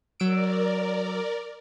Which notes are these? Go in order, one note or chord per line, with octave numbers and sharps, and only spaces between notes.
F#3 A#4 D5 E6 D7